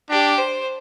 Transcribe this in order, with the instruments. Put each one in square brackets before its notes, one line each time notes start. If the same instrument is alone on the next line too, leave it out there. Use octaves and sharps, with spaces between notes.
[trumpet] D4 [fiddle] G4
[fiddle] C5